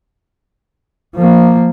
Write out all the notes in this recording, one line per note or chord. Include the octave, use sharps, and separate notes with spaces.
F3 A#3